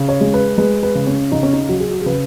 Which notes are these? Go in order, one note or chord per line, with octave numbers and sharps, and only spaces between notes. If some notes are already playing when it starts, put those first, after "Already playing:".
Already playing: C#3
C#5
G#3
B4
G#3 B4
B4
C#3
C#4
C#3 D#4
C#4
D#4
F#3 F#4
G#4
F#4
G#4
C#3 B4